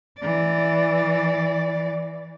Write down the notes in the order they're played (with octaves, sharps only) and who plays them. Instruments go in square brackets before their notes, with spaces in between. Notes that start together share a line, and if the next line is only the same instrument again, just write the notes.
[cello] E3 D5